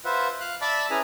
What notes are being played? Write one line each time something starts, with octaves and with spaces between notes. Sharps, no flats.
F4 B4 C5 E5 F#5
F5 F#6
D5 E5 A5 B5 D6 E6
C#4 E4 G#4 B4 G#5 A#5